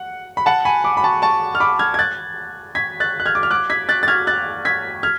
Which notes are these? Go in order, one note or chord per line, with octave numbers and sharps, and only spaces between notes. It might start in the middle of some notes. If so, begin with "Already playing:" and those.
Already playing: F#5
B5
F#5 A5
G#5 B5
B5 D6
B5
A5 C#6
A5 C#6
F6
B5 D6
F6 G#6
G#6
F#6 A6
G#6 B6
F#6 A6
F#6
F6 G#6
D6
F6
D6 F#6
G#6 B6
F#6 A6
A6
F6 G#6
F#6 A6
G#6 B6
F6 G#6